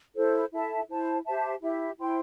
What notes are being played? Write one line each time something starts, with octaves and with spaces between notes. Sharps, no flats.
E4 A4 C5
E4 A4 E5 A5
E4 C5 A5
G4 C5 E5 A5
E4 G4 E5
E4 C5 G5 C6